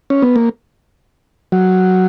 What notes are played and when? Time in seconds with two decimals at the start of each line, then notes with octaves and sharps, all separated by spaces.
0.10 C#4
0.22 B3
0.36 A#3
1.52 F#3